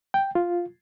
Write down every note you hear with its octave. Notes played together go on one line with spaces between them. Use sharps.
G5
F4